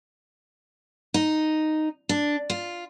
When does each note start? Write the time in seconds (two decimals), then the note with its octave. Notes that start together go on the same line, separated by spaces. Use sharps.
1.14 D#4
2.09 D4
2.50 F4